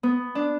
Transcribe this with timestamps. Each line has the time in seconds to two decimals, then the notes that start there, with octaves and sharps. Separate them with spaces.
0.03 B3
0.35 D4